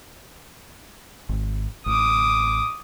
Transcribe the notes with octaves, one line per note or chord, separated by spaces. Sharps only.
G#1
A1 D6 D#6